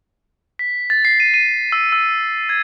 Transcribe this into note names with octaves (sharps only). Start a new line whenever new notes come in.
B6
A6
C7
D#7
D#7
E6
E6
G#6